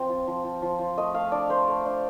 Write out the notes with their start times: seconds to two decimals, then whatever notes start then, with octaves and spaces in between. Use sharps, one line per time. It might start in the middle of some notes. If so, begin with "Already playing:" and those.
Already playing: F3 C4
0.09 F4
0.27 F3
0.44 F3
0.62 F3
0.79 F3
0.97 A3 D#5
1.14 A3 F5
1.32 D4 D5
1.49 A3 C5
1.68 A3
1.85 D4